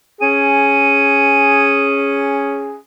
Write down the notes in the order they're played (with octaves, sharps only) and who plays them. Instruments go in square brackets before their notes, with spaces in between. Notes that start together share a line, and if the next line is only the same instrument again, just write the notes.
[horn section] C#4 G#4